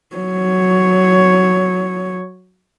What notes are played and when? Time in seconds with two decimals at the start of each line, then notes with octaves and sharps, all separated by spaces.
0.16 F#3 C#5